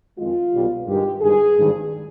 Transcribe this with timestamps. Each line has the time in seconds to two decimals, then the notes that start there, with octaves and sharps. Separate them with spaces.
0.18 F2 D#3 G#3 F4
0.53 B1 B2 G3
0.87 G2 D#3 G#3 G4
1.22 G1 G2 D#3 G#3 G#4
1.57 G#1 G2 D#3